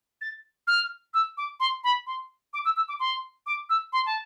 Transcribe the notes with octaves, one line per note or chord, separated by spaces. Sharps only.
A6
F6
E6
D6
C6
B5
C6
D6
E6
E6
D6
C6
D6
E6
C6
A5